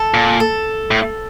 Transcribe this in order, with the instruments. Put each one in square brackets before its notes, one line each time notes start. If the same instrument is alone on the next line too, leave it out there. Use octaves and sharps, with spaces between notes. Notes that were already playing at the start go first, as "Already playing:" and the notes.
Already playing: [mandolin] A4
[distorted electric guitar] A#2
[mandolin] A4
[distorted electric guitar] A2